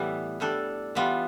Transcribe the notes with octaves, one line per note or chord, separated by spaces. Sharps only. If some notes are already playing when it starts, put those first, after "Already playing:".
Already playing: A2 E3 G3 B3
A2 G3 D4 A4
E3 G3 B3 F4